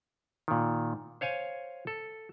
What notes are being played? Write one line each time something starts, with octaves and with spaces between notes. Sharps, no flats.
A#2 D#3
C5 C#5 F5 G#5
A4